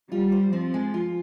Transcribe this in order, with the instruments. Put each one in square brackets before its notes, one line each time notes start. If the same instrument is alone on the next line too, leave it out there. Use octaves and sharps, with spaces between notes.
[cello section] G3 [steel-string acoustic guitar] F4
[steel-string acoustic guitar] C5
[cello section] F3 [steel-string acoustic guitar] C4
[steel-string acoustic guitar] G#3
F4